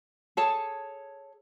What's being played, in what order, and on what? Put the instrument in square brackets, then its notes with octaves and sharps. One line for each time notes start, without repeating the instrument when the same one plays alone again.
[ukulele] G#4 A4 C#5 A5